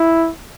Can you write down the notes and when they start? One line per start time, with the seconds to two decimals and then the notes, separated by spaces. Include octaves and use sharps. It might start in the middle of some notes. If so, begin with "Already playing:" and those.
Already playing: E4